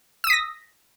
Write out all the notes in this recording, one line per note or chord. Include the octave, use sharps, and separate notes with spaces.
D#6 E6 A#6 B6